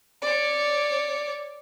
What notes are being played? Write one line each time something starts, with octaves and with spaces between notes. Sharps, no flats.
C#5 D5